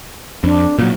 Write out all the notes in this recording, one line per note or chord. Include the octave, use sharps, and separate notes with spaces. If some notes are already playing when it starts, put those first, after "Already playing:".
F2 D4
A#2 F#3